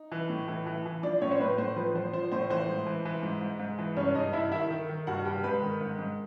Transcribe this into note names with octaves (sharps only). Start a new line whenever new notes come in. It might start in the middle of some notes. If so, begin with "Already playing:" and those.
Already playing: D#4
E3
A2
E3
E3
E3
F3 D4 D5
A2 C#4 C#5
C5
A2 B4
A2 C5
F3 B4
F3 C5
F3 C5
A2 C5
E3 C5
G#2
E3
E3
G#2
G#2
G#2
E3
G2 C#4 C#5
G2 D#4 D#5
G2 E4 E5
D#3 E4 E5
D#3
D#3
G2 F#4 F#5
G2 G4 G5
G#2 B4 B5
D#3
G#2
G#2